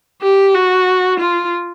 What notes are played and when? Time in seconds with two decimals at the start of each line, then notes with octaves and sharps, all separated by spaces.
0.22 G4
0.54 F#4
1.19 F4